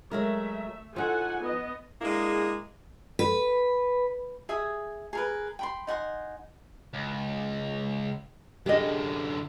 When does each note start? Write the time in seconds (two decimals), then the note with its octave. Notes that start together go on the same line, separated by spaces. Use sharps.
0.11 F#3 G#3 A3 A#4 E5
0.96 F3 D#4 F#4 A4 F#5 G#5
1.41 B3 D#5
2.02 G#3 A#3 D4 E4 G#4
3.19 B4
4.49 G#4 E5 G#5 D#6
5.13 G#4 A#4 B4
5.59 G5 B5 C6
5.87 D#4 F#5 G#5 C6
6.93 C#2
8.66 F#2 D3 G4 G#4 D#5